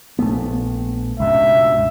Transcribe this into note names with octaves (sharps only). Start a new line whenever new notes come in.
A#1 A3 B3
C#2 G2 B2 E5